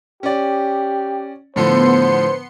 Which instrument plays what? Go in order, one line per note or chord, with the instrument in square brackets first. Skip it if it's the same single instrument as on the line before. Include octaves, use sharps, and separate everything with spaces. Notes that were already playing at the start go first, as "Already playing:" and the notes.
[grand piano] C#4 D5 [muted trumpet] G4
[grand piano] A2 D3 F3 [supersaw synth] B3 C6 C#7 [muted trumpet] C5